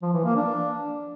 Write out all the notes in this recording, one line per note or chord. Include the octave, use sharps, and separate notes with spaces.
F3
E3
A#3
D4